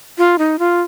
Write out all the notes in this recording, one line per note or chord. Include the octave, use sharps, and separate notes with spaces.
F4
D#4
F4